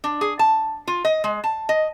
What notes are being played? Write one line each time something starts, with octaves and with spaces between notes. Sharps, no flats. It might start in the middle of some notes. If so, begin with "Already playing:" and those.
D4
G#4
A5
F4
D#5
G#3
A5
D#5